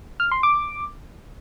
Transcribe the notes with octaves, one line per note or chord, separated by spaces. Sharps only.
F6
C6
D6